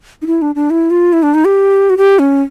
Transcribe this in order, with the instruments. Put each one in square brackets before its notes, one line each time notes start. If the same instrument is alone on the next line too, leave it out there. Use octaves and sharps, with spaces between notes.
[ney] D#4
E4
D4
D4
E4
F4
E4
D4
D#4
G4
F#4
G4
C#4